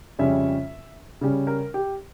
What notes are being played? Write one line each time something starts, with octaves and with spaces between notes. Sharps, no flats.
F2 C#3 G3 C#4 E5
C#3 G3 C#4
A#4
G4